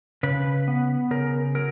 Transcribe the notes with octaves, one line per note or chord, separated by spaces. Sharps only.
C#3 B4
B3
C#3 A#4
F#3 A#4